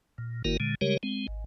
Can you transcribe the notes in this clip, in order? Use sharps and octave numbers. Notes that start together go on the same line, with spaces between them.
A#2
G1 D#3 A#3 E4 F#4 A#4
A#2 D3 G#3
C#3 G3 G#3 G4 A#4 C#5
G#3 C4
G#1